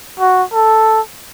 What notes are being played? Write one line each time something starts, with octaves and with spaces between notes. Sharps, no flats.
F#4
A4